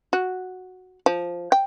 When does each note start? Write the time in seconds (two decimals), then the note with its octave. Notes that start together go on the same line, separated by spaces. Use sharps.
0.13 F#4
1.06 F3
1.52 G5